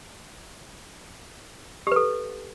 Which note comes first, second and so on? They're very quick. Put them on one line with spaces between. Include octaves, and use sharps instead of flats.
G4 B4 A4